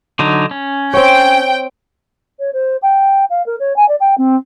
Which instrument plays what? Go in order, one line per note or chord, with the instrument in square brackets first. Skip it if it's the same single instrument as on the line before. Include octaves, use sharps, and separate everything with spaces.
[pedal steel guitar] D3 F#3 D#4
C#4
[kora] C4 C#5 [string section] G5
[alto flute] C#5
C5
G5
F5
A#4
C#5
G#5
D5
G5
C4